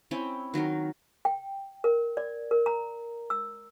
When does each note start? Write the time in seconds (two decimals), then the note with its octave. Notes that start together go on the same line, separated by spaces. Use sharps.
0.11 C4 C#4 E4 G5
0.54 D#3 F#3 D#4 A#4
1.25 G5
1.84 A#4
2.17 D5
2.51 A#4
2.66 A#5
3.30 E6